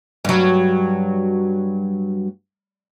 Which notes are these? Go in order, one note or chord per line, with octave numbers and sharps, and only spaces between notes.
G2 F#3